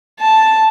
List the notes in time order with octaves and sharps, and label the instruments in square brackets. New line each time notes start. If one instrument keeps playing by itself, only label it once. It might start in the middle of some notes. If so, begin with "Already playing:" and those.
[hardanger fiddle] A5